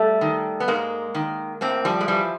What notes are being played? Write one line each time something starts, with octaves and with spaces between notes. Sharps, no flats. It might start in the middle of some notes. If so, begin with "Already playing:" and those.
Already playing: G3 A3
D#3
B3
G#2 G#3 A#3
D#3
A2 A#3 C4
F3 G3
G#3
E3 F3 G3